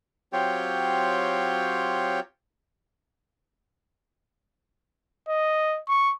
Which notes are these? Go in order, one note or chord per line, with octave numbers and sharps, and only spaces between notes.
F#3 C4 F4 G4 C#5 G5
D#5
C#6